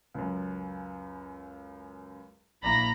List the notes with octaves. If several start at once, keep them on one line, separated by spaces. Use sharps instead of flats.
C#2 F#2
A#1 A#3 E4 D5 A#5 B5 A#6